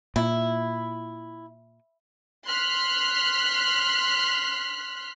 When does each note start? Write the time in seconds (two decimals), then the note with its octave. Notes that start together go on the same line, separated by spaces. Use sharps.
0.16 A#2 E4
2.46 C6 F6 F#6 B6